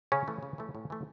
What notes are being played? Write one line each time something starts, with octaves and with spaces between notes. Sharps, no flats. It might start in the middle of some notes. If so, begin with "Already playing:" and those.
C#3 C#4
E3 A3
C#3
E3 A3
A2
E3 A3